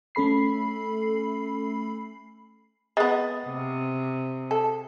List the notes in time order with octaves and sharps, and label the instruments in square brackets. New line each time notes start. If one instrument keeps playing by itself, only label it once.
[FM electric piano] A3 C#4 A4 B5 C7
[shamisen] G#3 B3 [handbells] D#6 A6
[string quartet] C3
[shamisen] A4